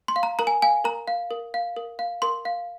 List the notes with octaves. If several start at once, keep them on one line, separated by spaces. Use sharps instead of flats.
C6
F5
A#5
A#4 A#5
G#5
F5 G#5
A#4 A#5
F5
A#4
F5
A#4
F5
A#4 C6
F5